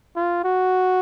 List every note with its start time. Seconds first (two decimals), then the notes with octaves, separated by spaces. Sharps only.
0.16 F4
0.44 F#4